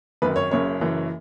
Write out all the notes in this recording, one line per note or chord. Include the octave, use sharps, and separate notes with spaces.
G#1 F#2 D#3 B4
C#5
F#1 F#2 C#3 C#5
F#1 F#2 E3